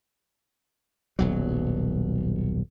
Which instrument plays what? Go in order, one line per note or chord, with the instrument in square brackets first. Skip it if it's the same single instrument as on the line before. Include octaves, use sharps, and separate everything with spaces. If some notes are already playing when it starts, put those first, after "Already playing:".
[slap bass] D#1 B1 F#3